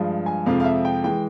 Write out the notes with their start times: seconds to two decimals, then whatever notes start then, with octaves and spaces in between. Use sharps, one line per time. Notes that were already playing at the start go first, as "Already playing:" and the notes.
Already playing: G2 F3 G#3
0.26 G#5
0.46 F2 C3 F3 G#3 F5
0.60 F5
0.65 E5
0.85 G5
1.04 E3 G#3 G5